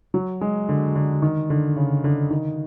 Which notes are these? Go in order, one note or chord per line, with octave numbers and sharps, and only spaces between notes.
F#3
G#3
D3
D3
D#3
D3
C#3
D3
D#3